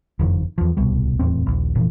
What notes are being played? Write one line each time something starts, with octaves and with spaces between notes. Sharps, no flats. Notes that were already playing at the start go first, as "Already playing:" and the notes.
F#1 F2 D#3
E2 F3
D1 C2 B2 G3
D#1 E2 A2 C4
A#1 D#2
F1 A#2 E3 F3